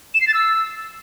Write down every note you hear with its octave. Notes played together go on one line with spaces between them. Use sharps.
E7
C7
A6
E6